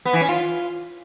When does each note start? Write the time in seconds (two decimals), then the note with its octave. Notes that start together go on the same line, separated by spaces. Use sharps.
0.05 B3
0.13 E3
0.21 C#4
0.29 F4